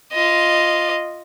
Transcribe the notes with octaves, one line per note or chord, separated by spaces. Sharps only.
F4 D#5